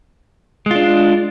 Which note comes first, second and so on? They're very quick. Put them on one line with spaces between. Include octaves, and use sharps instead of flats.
G#3 F4 D4